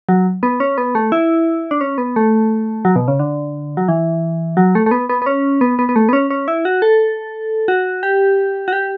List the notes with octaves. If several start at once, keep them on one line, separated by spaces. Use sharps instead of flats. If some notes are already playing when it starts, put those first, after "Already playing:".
F#3
B3
C#4
B3
A3
E4
D4
C#4
B3
A3
F#3
B2
C#3
D3
F#3
E3
F#3
A3
A3
B3
B3
B3
C#4
B3
B3
B3
A3
B3
C#4
C#4
E4
F#4
A4
F#4
G4
F#4
G4